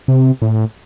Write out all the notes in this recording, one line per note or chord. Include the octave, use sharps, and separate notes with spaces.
C3
A2